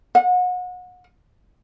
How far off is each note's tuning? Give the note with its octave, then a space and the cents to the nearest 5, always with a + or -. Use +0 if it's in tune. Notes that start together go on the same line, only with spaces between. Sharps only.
F#5 -30